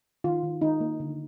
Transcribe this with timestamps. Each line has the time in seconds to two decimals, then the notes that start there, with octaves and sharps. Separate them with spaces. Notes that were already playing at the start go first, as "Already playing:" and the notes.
0.24 D#3 F4
0.43 D#3
0.61 D#3 D#4
0.81 A#3
1.00 D3